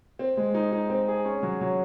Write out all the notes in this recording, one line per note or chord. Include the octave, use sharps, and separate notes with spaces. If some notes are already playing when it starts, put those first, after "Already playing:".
C4
G#3
D#4
D#4
C4
G#4
C#4
F#3
F#3